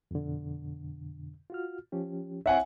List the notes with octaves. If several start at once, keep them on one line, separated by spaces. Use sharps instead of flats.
F2 B2 D3
F4 F#4 F6
F3 C#4 G4
C4 E4 C#5 E5 F#5 G#5